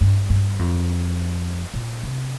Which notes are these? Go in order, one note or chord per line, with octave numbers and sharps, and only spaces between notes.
G2
G2
F2
A#2
C3